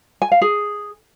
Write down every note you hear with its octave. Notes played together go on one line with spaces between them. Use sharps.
G#5
F5
G#4